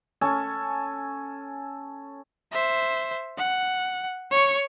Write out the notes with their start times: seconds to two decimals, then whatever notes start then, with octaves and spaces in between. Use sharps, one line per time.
0.21 C#4 A4 G#5
2.52 C5 E5
3.37 F#5
4.31 C#5 C#6